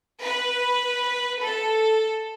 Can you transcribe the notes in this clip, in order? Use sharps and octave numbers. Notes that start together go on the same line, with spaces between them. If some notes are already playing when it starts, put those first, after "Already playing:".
B4
A4